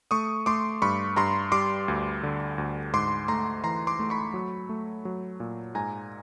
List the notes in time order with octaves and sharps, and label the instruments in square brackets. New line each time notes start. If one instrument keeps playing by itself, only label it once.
[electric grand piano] A3 C#6 D#6
A3 C6 D6
G2 B5 C#6
G2 A#5 C6
G3 C6 D6
D2
D3
D2
G#2 C6 D6
A3 A#5 C6
E3 A#5 C6
C6 D6
A3
B5 C#6
F#3
A3
F#3
A#2
G#2 G#5 A#5